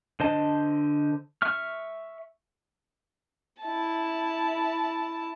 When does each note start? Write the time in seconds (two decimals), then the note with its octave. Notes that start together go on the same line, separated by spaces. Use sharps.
0.20 D3 C5 D#5 A5
1.42 E5 C#6 F6
3.62 E4 A5